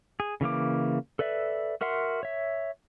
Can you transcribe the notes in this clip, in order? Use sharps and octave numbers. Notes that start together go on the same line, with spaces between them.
G#4
C#3 E3 A#3 D6
A4 B4 D5 E5
F#4 A#4 E5 F#5 C6
C#5 E5